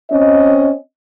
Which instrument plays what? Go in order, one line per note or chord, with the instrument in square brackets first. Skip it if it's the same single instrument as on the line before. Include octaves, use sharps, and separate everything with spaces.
[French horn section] C4 C#4 D#5